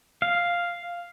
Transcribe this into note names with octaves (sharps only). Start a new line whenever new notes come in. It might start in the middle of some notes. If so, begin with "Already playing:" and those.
F5